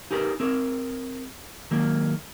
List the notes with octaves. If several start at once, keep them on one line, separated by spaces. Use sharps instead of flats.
D#4 G4 G#4 A#4 B4
C4 G#4 A#4
D#3 F#3 G#3 A#3